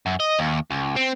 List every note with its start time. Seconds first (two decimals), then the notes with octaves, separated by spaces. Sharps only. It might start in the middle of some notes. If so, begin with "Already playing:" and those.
0.06 F#2
0.20 D#5
0.39 D#2
0.70 C#2
0.96 C4